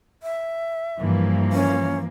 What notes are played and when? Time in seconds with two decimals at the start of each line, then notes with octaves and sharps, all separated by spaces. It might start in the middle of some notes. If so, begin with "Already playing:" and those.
0.23 E5
0.98 G2 E3 F3 A#3
1.53 C#4